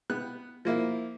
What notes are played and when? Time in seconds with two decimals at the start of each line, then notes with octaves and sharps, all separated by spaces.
0.10 B3 F#6
0.65 F3 A#3 E4